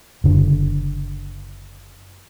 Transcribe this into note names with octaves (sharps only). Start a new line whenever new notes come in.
F#1 D3